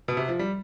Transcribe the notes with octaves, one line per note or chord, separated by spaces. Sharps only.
B2
C3
F3
G3